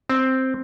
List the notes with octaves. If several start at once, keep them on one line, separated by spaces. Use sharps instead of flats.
C4